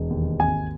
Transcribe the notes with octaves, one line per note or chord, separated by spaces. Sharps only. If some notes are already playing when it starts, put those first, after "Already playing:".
Already playing: E1
D#2
G#1 G#5